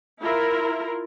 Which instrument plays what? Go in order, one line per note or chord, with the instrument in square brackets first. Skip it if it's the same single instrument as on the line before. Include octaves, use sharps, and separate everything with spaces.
[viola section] E4 F4 A#4